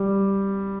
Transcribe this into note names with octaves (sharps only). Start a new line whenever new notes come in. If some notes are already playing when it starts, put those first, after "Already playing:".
Already playing: G3